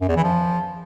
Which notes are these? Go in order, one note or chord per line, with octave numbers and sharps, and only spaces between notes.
F#2
E2
E3
F3